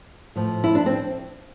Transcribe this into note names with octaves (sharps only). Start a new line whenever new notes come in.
A2 F3
E4
D4
C4